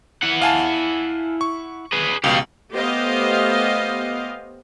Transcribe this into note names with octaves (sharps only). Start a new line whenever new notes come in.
E4 F#5
F5 G#5 A5
C#6
G#4 B4
C#2 B2 G4 F5
A3 B3 G4 C5 D#5 F5